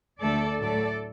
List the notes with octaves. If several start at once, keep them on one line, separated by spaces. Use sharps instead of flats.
D2 D3 A3 A4 D5
A2 F#3 A3 A4 D5